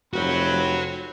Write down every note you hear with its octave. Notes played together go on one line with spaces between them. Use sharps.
F1 C4 F#4 B4 C#5